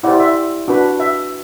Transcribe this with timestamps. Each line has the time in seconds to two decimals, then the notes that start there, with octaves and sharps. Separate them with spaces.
0.03 E4 G4 C5 D5 F#5
0.19 E5
0.68 D4 F#4 B4
1.00 E5